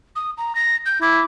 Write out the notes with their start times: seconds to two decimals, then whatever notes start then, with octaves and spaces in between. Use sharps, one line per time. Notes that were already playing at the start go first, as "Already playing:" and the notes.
0.15 D#6
0.37 A#5
0.55 A#6
0.85 G6
1.01 E4 D6